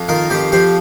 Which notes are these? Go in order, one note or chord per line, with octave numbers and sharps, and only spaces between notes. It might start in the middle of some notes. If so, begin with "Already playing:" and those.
Already playing: F2
D#3 F4 A#4
F2 G4 C5
F3 G4 C5